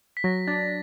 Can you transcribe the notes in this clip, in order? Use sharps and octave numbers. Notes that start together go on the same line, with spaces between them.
B6
F#3 A#6
D4 A6